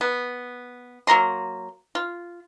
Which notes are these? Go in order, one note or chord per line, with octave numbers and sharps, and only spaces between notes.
B3
F#3 A#3 A#5 C6
F4